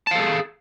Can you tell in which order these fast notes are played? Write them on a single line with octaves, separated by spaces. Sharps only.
A5 F5 A4 G#4